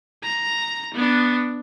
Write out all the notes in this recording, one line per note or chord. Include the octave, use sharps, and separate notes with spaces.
A#5
B3 D4